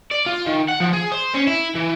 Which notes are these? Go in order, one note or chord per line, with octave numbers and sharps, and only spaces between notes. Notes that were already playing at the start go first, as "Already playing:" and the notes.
D5
F4
D#3
F#5
F3
G#4
C5
C#4
E4
E3